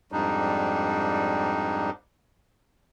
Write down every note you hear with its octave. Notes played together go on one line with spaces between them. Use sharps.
F2 G#2 G3 D4 D#4